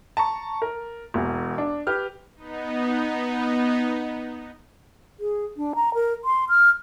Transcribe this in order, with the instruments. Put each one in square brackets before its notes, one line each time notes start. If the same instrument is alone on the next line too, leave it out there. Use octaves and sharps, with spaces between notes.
[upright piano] A5 A#5 C#6
A#4
E1 E2
D4
G4 B4 F6
[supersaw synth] B3 D#4
[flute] G#4
D4
A#5
A#4
C6
F6